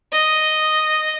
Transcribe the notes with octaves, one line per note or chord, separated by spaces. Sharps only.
D#5